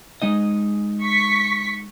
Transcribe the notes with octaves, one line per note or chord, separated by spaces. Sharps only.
G#3 D#4 D#5
C#6 B6